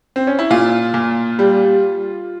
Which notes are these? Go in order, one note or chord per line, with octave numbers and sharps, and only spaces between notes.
C4
C#4
E4
A#2 F4
A#2
G3